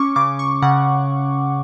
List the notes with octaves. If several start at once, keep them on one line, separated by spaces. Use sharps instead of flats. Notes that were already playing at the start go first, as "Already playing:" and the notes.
Already playing: C#4 C#6 D6
C#3 D6
C#6
C#3 F#5